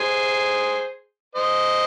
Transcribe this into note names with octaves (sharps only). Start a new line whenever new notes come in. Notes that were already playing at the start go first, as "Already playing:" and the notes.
Already playing: G#4 C5
C5 D#5